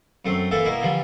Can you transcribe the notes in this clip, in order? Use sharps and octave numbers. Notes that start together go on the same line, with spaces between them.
F#2 A3 C4
E3 A#3 A4 E5
B2 A#3 E4
D3 E3 F3 G3